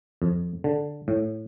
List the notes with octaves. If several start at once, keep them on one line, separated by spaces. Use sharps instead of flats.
F2
D3
A2